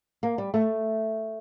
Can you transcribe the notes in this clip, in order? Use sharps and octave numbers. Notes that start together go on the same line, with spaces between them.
A#3
G3
A3